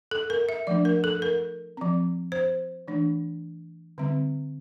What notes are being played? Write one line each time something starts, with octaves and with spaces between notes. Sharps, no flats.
A4
A#4
E5
F3 A3 D4 D5
A#4
A4
A#4
F3 C4
C5
E3 A3 D4
D3 G3 C4